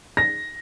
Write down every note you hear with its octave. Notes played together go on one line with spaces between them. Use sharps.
A#6